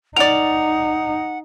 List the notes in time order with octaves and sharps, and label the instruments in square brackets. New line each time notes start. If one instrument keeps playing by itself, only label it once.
[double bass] D#4 [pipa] A#4 D5 [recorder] F#5 [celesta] F7